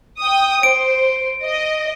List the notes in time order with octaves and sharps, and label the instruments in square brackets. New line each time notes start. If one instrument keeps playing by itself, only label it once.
[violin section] G5 D#6
[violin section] C5 [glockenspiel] D7
[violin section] D#5